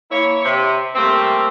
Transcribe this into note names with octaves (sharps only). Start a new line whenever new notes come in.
A#3 E4 C#5
C3
G3 A3 A#3 C4